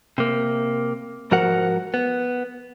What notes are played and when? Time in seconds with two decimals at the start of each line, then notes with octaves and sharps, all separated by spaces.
0.18 C3 A#3
1.31 G#2 F3 F#4 A#4 F#5
1.94 B3